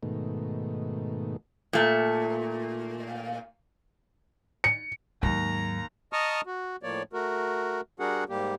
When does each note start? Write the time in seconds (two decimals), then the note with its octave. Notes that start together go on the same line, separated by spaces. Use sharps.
0.03 G#2 B2 D#3 A3
1.73 A#2 A3
4.64 C#7
5.23 D#2 G#2 F#3 A#5
6.13 D#5 A5 A#5 C#6 D#6 F6
6.46 F#4
6.83 A2 F3 A#3 C#5 D5
7.13 A3 F#4 A#4
8.00 G3 D4 F#4 G#4 A#4 F#5
8.29 G#2 G3 A#3 G4